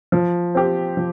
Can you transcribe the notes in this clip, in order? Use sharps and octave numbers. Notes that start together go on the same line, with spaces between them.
F3
C4 G4
F3